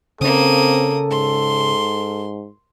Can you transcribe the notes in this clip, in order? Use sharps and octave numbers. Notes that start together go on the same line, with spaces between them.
C#3 A#3 C4 C#4 A4 D#6
G#2 C6